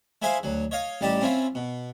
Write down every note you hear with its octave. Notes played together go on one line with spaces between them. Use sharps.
G#3 E4 G#4 C5 E5 F5
D2 F#3
C#5 D#5 F5
A1 G3 D#4 G4 A5
C4 C#4 E4 F4
B2